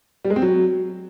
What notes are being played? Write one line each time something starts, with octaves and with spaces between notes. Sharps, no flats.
G3
G#3
C4
F#3